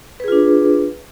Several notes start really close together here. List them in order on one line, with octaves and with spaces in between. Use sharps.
B4 G#4 F4 D4